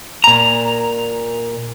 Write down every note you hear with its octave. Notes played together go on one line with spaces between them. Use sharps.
A#2 A#5